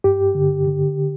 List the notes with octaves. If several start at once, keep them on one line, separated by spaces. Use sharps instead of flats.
G2 G4
D3
D3